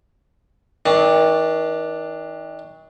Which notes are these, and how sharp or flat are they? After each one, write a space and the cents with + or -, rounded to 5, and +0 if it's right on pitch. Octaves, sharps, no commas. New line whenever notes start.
D#3 +40 D4 +0